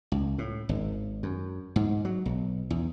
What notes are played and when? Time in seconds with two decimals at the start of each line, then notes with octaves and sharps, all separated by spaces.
0.12 C#2
0.38 A2
0.69 G#1
1.23 F#2
1.76 G#2
2.05 F#3
2.26 B1
2.70 E2